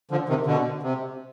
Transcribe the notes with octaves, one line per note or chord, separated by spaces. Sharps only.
D3 F3
C3 D#3
B2 D3
C3